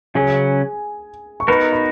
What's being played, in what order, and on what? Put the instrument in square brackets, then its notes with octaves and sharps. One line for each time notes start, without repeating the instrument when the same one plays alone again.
[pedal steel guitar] C#3 F#3 C#4 [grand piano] G#4 G#5
[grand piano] C#6
[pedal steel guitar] B3 D#4 F#4 A#4 [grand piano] B4 B5
[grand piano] B5